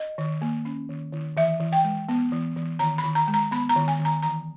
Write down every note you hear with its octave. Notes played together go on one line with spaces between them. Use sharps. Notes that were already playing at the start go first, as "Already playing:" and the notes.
Already playing: D#5
D#3
A#3
C#4
D#3
D#3
E3 E5
E3
G5
G#3
B3
E3
E3
D#3 A#5
B5
D#3
A#5
G#3
A#5
B3 B5
A#5
D#3
G#5
D#3
A#5
E3 A#5